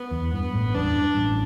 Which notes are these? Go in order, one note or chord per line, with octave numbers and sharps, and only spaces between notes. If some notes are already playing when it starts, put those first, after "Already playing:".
Already playing: B3
E2
G2 B3
A1 A2
G2
E2 D4
G2
A1 A2